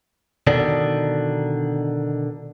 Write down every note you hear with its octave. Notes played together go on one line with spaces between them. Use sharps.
B2 D3 D#3 D4